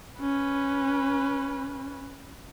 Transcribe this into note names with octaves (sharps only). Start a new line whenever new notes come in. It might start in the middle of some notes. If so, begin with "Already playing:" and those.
C#4 B4